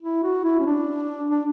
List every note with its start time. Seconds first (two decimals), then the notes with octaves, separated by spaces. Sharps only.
0.02 E4
0.23 F#4
0.44 E4
0.59 C#4
0.66 D4
1.30 D4